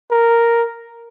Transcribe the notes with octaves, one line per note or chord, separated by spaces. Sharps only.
A#4